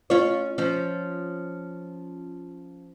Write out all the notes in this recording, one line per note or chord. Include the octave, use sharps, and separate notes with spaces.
C#4 F4 C#5
F3 C#4